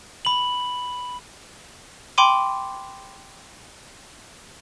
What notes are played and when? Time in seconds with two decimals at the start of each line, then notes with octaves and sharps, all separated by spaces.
0.25 B5 F#7
2.18 G5 B5 C6 D6 D#7